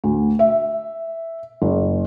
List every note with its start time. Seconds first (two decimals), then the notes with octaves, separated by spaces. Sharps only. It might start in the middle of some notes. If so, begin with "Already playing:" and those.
0.04 D2
0.39 E5
1.62 F#1